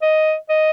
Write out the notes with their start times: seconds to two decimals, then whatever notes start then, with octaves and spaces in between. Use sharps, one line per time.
0.02 D#5
0.49 D#5